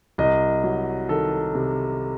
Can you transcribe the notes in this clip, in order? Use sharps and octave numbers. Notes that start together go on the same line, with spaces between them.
C2 D#5
F#3
D#3 A4
C3